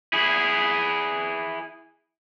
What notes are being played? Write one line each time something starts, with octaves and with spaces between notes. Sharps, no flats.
E4 G#4